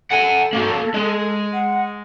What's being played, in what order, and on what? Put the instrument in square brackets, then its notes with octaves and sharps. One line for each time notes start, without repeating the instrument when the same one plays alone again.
[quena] A4 [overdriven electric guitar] F#5 G#5
[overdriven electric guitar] A#3 F#4
G#3
[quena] F#5